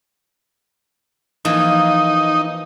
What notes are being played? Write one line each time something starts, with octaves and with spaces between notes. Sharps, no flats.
E3 F3 A#3 D#4